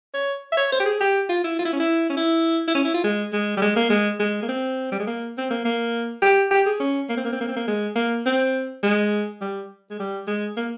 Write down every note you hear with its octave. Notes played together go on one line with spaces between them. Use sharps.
C#5
E5
C#5
C5
G4
G#4
G4
F4
E4
F4
E4
C#4
E4
C#4
E4
E4
C#4
E4
F4
G#3
G#3
G3
G#3
A#3
G#3
G#3
A#3
C4
G3
G#3
A#3
C4
A#3
A#3
G4
G4
G#4
C#4
A#3
C4
A#3
C4
A#3
C4
A#3
G#3
A#3
C4
G#3
G3
G#3
G3
G#3
A#3